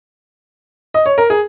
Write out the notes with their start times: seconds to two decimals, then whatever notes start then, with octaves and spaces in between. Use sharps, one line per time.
0.94 D#5
1.06 C#5
1.18 A#4
1.30 G#4